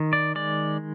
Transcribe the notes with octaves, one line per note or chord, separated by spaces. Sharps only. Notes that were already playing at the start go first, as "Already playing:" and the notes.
Already playing: D#3
D5
G#3 D5